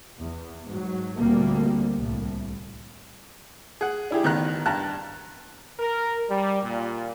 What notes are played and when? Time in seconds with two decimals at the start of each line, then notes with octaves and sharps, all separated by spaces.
0.19 E2
0.68 G#2 F#3
1.18 D2 A#2 D3 G3 A#3 C4
1.97 C2 A2
3.81 G#4 F#5
4.11 D4 E4 G4 G#4
4.23 A1 D#3 B3 A#5 F#6
4.66 G2 A5 A#5 F#6
5.79 A#4
6.30 G3
6.62 A#2